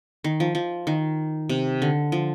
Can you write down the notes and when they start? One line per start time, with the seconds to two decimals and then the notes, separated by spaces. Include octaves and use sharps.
0.24 D#3
0.40 F3
0.55 F3
0.87 D#3
1.49 C3
1.82 D3
2.12 F3